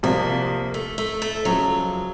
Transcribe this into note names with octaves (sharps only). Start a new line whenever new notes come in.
C2 C3 F3 A#3
A3
A3
A3
C#2 C#3 F3 F#3